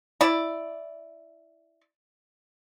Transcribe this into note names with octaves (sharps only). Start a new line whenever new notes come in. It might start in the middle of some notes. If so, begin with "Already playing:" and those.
E4 D5